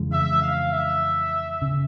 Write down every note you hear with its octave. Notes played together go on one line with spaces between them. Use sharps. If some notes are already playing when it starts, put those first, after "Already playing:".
Already playing: F2 C#3 E3 G#3
E5
F5
E5
C#3